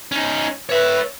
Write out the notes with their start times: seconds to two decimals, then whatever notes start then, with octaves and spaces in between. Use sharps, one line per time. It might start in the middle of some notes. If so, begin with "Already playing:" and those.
0.12 C#4 D#4
0.69 B4 C#5 E5